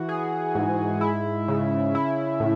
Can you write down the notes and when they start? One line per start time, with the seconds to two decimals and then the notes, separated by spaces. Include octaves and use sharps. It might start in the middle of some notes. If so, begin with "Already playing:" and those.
Already playing: E3 F#4
0.09 G#4
0.55 G#2
1.01 E4
1.48 C#3
1.95 E4
2.40 A2